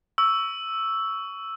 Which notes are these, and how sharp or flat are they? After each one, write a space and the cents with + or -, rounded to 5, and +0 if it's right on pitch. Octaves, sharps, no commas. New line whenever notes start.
C#6 +20 E6 +0